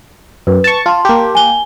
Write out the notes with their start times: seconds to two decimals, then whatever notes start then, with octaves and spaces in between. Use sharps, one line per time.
0.47 F#2 B4
0.64 A5 C#6
0.86 F4 A5 C6
1.05 A#3 G4
1.35 G#5 G7